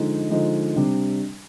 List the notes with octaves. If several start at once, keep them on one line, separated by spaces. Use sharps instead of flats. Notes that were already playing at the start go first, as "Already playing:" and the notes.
Already playing: D3 F3 G#3 D#4
D3 F3 G#3 D#4
C3 G3 D4